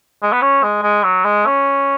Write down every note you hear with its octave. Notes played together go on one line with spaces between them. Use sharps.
G#3
B3
C#4
G#3
G#3
F#3
G#3
C#4